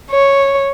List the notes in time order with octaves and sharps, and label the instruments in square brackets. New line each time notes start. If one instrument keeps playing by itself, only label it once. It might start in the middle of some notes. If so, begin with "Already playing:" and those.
[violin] C#5